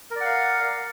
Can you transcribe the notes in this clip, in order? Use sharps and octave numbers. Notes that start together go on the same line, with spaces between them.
A#4 D5 F5 F#5